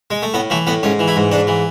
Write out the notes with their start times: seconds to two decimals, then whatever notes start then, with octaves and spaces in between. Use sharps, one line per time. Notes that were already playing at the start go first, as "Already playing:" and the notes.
0.11 G#3
0.22 A3
0.34 A2 B3
0.50 E3 A3
0.67 A2 B3
0.83 G#2 C#4
0.99 E3
1.08 E4
1.16 G#2
1.32 G#2 D4
1.47 E3